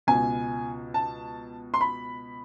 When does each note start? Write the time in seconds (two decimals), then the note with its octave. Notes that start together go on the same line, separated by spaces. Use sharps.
0.07 C#2 B2 G#5
0.94 A5
1.74 C6
1.81 B5